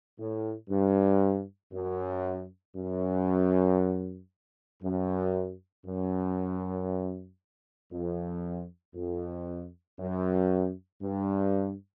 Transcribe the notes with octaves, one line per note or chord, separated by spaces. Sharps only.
A2
G2
F#2
F#2
F#2
F#2
F2
F2
F#2
G2